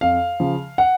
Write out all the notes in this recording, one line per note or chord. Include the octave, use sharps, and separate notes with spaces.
F2 F5
C#3 F3
F#5